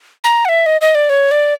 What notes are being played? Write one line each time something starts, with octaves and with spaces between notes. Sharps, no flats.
A#5
F#5
E5
D#5
D#5
D5
C#5
D5